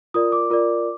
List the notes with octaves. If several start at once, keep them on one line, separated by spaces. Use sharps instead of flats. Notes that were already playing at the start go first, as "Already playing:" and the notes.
F4 A#4 D5 D#6
D6
F4 A#4 D5